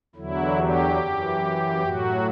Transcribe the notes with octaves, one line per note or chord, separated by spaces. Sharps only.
E2 D3 F#3 E4
G4
F#2 E3
A2 F#3 F#4